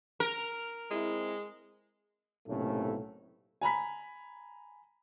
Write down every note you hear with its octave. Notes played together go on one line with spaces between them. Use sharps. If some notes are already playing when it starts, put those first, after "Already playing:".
A#4
G#3 C4 E4
B1 A2 C3 A3 A#3 C#4
G#5 A#5 B5 B6